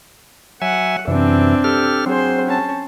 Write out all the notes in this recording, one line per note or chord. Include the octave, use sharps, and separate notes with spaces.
F#3 E5 F#5 G#5
F#2 C3 E3 C4 D4
G4 A4 F6
F#3 C4 G#4 C5
C#4 A5